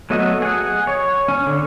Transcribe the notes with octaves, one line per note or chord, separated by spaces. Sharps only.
F#3 A3 B3 F#4 D#5
G#4 F#5
C#5
C#4
D3